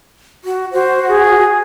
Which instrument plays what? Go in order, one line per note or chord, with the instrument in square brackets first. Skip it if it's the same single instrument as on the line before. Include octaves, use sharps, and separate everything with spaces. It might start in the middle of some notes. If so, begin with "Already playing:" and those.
[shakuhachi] F#4
[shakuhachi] F#4 [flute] C5
[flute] G#4